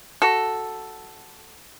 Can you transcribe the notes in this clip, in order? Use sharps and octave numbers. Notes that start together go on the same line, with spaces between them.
F#4 A4